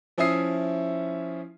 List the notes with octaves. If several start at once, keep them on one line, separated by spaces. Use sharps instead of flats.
F3 C#4 E4 E5 D#6 C7